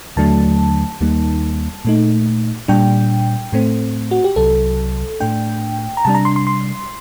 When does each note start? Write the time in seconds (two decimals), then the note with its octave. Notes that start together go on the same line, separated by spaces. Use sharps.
0.16 D#2 D3 F#3 A3 D4 A5
1.01 D#2 D#3 G3 A#3 D#4
1.85 A#2 A3 D#4
2.68 A#2 G3 D4 G5
3.52 A2 A3 C4
4.11 F#4
4.24 G4
4.36 C2 C3 F#3 A4
5.20 A2 A3 D4 G5
5.97 A#5
6.05 C3 G3 D4 A5
6.14 A#5
6.25 C6
6.36 C6
6.47 C6